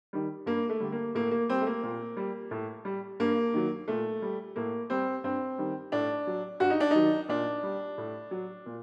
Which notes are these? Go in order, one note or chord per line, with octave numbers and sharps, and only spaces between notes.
D#3 G3
G2 A#3
A3
D3 G3
A#3
A2 A#3
A#3
G3 C4
A3
A#3
A#2
G3
A2
G3
G2 A#3
D#3 F#3
A#2 A3
G3
A2 A#3
G3 C4
G2 C4
D#3 G3
A2 D4
F#3
G2 F#4
D#4
D4
D#3 F#3 D#4
A#2 D4
G3
A2
F#3
A#2